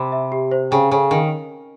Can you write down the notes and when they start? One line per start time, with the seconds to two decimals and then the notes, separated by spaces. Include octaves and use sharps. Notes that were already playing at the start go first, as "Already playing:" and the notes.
Already playing: C3 B5
0.12 E5
0.32 G4
0.51 C5
0.71 C#3 G5
0.91 C#3 A4
1.11 D#3